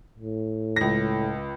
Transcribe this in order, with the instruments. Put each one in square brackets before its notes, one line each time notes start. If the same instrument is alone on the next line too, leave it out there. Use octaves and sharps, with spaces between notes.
[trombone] A2
[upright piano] C#2 A#6